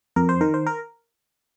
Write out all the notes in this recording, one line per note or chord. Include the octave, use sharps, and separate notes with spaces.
F2 A#4
C5
D#3 A#4
C5
A#4